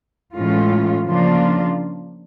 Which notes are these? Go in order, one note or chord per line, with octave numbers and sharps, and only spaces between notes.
A2 E3 G#3 C#4 F4
C#3 F3 A#3 D4 F4